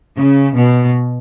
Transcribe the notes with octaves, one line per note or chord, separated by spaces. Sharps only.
C#3
B2